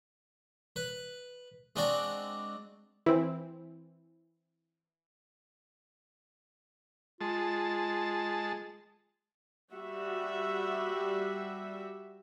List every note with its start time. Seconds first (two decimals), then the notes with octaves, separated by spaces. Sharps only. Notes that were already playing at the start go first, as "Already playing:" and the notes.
0.76 B4
1.76 G#3 C4 D4 F#4 D5
3.06 E3 C4
7.21 G#3 F4 A5
9.72 G3 F#4 E5